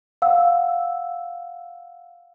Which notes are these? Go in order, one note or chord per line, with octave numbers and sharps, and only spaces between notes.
F5 F#5 E6